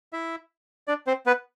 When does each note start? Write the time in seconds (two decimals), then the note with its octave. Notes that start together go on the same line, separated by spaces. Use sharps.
0.13 E4 E5
0.88 D4 D5
1.07 C4 C5
1.26 B3 B4